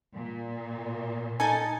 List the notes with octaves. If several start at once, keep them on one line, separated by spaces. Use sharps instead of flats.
A#2
D#4 A4 G#5 A5